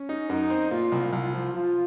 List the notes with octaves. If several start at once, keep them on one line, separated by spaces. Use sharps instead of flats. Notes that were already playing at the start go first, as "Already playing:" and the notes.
Already playing: C#4
D#4
F#2 D#4
C4
A#2 F4
C2
C2 F4
F3
F3 F4